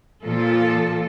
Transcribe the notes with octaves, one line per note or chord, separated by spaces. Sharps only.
A#2 F3 F4 A4